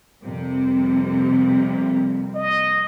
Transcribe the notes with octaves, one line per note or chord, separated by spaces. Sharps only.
F2 C3 G3 A#3
D#5